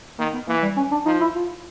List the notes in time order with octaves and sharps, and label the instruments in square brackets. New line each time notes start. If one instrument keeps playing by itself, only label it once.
[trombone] D#3 [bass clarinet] A#3
[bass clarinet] B3
[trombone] E3 [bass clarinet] A#3
[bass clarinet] G3
C#4
D4
[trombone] F3 [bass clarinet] D#4
[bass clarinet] E4
F4